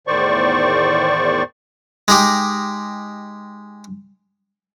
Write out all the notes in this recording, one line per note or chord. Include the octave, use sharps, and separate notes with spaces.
E2 A2 D#3 C5 D5 C#6
G#3 D#4 G4